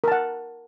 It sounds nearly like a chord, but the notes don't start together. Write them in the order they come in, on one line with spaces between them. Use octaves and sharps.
A#4 A5 F#5